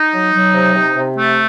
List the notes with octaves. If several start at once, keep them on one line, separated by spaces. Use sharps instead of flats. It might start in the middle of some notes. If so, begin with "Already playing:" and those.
Already playing: D#4
F#3
F#3
C3
C3
C3
A3